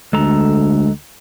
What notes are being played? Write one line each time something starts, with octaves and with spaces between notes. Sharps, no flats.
D2 G#3 A4 A#5